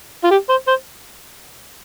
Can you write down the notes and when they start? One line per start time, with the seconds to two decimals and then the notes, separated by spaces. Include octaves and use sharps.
0.24 F4
0.30 G4
0.49 C5
0.67 C5